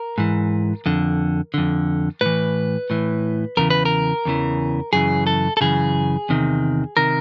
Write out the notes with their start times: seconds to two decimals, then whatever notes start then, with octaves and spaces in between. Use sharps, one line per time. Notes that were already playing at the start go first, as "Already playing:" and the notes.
Already playing: A#4
0.18 G#2 E3
0.86 F2 D3
1.54 F2 D3
2.21 A2 E3 B4
2.90 A2 E3
3.57 E2 C#3 E3 A#4
3.70 B4
3.85 A#4
4.25 E2 C#3 E3
4.93 F#2 C#3 E3 G#4
5.27 A4
5.57 A4
5.61 F#2 C#3 E3 G#4
6.29 E2 C3 D#3
6.97 C3 D#3 A#4